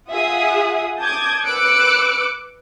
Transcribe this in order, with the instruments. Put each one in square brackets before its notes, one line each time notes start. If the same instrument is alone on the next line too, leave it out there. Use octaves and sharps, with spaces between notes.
[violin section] F4 G#4 E5 F#5 D#6
A5 D6 D#6 G6 G#6
B4 D6 E6 F#6 C#7 D7